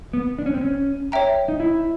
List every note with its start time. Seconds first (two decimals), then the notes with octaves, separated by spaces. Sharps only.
0.13 B3
0.38 D4
0.46 C#4
0.54 C4
0.61 C#4
1.12 C#5 E5 G5 A#5
1.48 D#4
1.60 E4